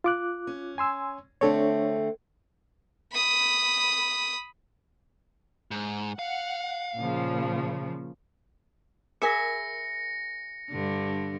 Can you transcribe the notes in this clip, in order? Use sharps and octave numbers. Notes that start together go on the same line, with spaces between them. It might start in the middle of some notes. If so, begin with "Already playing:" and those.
F4 D6 F#6
C#4
G#5 C6 E6
D3 A3 C4 D4 A4 C#5
B5 D#6
G#2
F5 F#5
A#2 C#3 F3
G#4 A#4 E5 G#5 B5 A#6 C#7
G2 D3